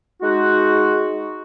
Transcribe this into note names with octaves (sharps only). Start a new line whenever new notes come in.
G#3 D#4 F#4